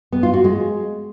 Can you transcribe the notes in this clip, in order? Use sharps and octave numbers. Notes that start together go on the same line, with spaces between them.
B3
F4
F#4
G#3